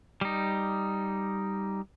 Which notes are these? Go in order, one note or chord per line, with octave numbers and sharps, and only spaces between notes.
G3 D#4